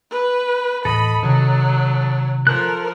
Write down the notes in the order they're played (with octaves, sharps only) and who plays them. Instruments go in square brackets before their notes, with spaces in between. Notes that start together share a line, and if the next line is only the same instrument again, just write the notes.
[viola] B4
[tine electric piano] D#2 A2 E3 [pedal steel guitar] A4 D#5 [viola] B5
[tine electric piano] C3 D#3 [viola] F#3
[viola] F3 A#4 [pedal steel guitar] A4 A5 F#6